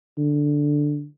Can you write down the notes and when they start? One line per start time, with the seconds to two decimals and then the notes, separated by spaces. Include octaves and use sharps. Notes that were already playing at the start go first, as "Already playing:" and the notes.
0.18 D3